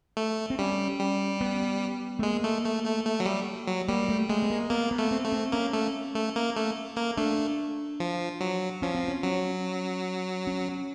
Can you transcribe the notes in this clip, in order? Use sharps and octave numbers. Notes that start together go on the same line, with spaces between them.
A3
C4
G3 C#4
G3
B3
A3
G#3 A#3
A3
A3
A3
A3
F#3
G3
F#3
G3 A#3
A3
G#3 A3
B3
A#3
A#3 B3
B3
A3
C4
A3
C4
A#3 C#4
A3
A3
A#3
A3
A#3
A3 D4
F3
F#3
F3 C#4
C4
C#4
F#3
C#4